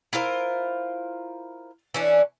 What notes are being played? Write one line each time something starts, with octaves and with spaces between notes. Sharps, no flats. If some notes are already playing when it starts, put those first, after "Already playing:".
E4 F4 A#4 C5
E3 C#4 D4